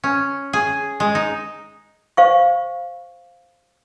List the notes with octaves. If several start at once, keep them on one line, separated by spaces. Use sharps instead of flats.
C#4
G#4
G#3
D#4
C5 F5 C#6